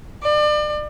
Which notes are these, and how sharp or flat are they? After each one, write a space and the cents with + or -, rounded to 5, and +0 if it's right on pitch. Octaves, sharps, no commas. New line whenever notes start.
D5 +35